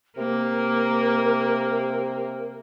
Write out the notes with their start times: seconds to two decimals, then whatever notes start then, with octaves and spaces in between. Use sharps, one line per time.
0.17 C3 A#3 A#4